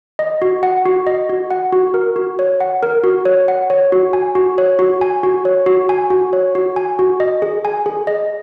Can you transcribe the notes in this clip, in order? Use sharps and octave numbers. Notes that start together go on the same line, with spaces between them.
D#5
F#4
F#5
F#4
D#5
F#4
F#5
F#4
A#4
F#4
C#5
F#5
A#4
F#4
C#5
F#5
C#5
F#4
G#5
F#4
C#5
F#4
G#5
F#4
C#5
F#4
G#5
F#4
C#5
F#4
G#5
F#4
D#5
G#4
G#5
G#4
D#5